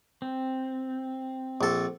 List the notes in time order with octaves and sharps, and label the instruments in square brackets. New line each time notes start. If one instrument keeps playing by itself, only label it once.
[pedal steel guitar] C4
[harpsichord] A#1 A4